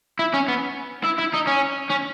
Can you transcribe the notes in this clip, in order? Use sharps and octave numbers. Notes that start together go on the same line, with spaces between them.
E4
C#4
B3
E4
E4
D#4
C#4
C#4